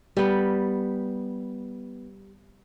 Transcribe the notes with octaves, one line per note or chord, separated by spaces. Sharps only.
G3 B3